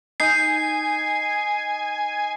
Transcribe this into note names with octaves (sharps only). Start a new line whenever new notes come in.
D#4 G#5 C7